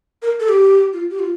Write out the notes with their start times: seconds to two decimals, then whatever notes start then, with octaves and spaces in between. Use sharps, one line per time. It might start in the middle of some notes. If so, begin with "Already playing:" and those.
0.22 A#4
0.40 A4
0.48 G4
0.93 F4
1.11 G4
1.19 F4